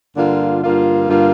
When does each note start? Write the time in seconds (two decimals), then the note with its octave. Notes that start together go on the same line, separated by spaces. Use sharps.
0.15 G2 D3 A#3 F4
0.62 G2 D3 A#3 F4
1.08 G2 D3 A#3 F4